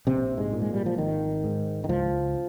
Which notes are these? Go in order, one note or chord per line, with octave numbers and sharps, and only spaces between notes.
A#1 C3 C4
G#2 G#3
A#2
G#3
G3
F3
G#1 D#3
G#2
D#3
C#2 F3